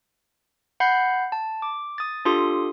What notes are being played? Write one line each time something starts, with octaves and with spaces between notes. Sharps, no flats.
F#5 B5 G6 C7
A5
D6
D#6 A6
D4 F4 G4 A4 C6 D#6